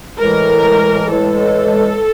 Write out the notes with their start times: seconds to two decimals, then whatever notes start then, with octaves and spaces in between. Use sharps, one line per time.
0.19 A2 E3 G#3 A#4
1.11 A2 E3 G#3 A4